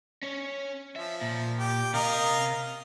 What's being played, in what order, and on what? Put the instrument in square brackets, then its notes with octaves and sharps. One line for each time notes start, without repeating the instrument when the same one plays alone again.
[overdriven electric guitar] C#4 C#5
[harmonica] F3 [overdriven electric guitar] E5
[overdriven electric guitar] A#2
[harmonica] G4
[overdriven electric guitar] C3 A#5 [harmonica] A#4 D#5 F5